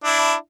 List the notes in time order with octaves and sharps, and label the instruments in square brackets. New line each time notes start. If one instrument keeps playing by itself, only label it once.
[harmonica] D4 E4